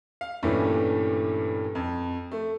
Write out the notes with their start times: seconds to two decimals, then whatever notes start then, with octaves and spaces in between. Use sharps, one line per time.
0.21 F5
0.43 G2 A#2 E3 G3 A3 C#4
1.75 F2
2.32 A3